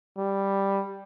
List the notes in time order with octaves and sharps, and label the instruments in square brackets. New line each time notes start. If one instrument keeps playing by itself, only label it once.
[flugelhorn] G3